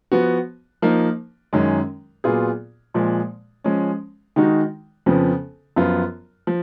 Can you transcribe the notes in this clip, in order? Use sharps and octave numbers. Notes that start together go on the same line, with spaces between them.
F3 B3 F#4
F3 A#3 D#4
F#2 D#3 G#3 C#4
A#2 F#3 B3 F4 G#4
A#2 F3 G#3
F3 G#3 C#4
D#3 G#3 D#4 F#4
F2 C#3 F3 B3
F#2 F3 B3 F4
F3